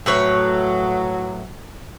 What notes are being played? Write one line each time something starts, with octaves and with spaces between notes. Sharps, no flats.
A2 F#3 B4 C#5